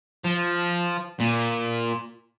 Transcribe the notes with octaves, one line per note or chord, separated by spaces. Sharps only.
F3
A#2